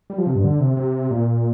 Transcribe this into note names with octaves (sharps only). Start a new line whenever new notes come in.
G3
F3
C3
G2
D3
C3
C3
A#2